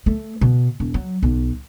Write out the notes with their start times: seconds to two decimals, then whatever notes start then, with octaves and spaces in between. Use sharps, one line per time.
0.06 A3
0.41 B2
0.80 E1
0.94 F#3
1.22 B1